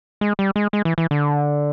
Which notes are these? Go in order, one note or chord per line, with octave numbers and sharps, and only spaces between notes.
G#3
G3
G#3
G#3
E3
E3
D3